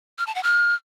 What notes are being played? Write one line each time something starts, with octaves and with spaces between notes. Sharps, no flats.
F6
A5
F#5
F6